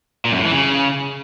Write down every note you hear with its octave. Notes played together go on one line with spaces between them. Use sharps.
A#2
F#2
A2
E3
C#3